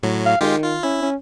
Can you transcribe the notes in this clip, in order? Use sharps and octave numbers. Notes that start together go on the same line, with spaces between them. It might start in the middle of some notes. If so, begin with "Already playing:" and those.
A2 F#3
F5
D#3 G#3 F4 G4
F4
C#4 E4
C#4